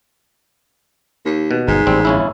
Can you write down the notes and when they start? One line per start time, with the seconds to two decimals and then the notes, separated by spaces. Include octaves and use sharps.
1.26 D#2
1.51 B2
1.68 G1 G#2
1.87 A1 G3 C4
2.05 G1 C#4 E4